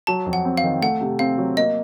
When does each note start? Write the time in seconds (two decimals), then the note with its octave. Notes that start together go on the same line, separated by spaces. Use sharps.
0.07 F#3 A5
0.26 F2
0.33 F#5
0.45 C4
0.57 F5
0.63 D#3
0.81 A3 F#5
1.01 C3
1.19 C4 F5
1.38 F#3
1.57 A#3 D#5